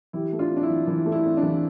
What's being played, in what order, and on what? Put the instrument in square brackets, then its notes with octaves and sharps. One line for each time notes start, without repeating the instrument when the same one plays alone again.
[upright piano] E3 E4 G4
A3
D4 F4
C4
D4
E4
E3
E3 E4
A3
E4
C4
D4
E3